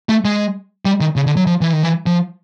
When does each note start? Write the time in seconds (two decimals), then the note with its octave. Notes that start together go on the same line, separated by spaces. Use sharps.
0.09 A3
0.25 G#3
0.85 G3
1.01 D#3
1.16 C#3
1.26 D3
1.36 F#3
1.47 F3
1.61 E3
1.73 D#3
1.83 E3
2.06 F3